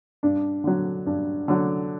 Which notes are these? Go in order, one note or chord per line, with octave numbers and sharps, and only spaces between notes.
G2 D4
D3 F#3
G2
D3 F#3